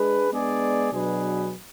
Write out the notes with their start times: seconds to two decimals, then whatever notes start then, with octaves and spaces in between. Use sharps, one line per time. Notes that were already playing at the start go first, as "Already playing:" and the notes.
Already playing: G#3 D4 G#4 B4
0.30 G#3 B3 D4 G#4 D5
0.91 B2 F#3 D4 G#4 B4